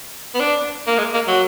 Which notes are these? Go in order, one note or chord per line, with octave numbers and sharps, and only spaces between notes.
B3
D4
A#3
G#3
A#3
F#3